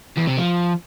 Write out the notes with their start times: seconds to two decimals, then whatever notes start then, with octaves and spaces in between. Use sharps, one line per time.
0.17 E2
0.27 C3
0.38 F3